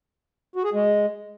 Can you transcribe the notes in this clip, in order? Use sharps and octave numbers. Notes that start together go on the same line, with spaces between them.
F#4
G#4
G#3